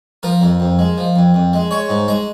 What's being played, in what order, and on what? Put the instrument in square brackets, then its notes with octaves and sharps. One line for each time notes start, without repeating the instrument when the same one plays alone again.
[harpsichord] F3 A#4
F2
F2
G#3
F3
F2
F2
G#3
G#3 C#5
G#2
G#3 A#5